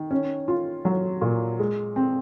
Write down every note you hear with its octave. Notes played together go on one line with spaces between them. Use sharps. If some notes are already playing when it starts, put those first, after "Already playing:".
Already playing: D#3
C#4
F4
F#3
A#2
G#3
C4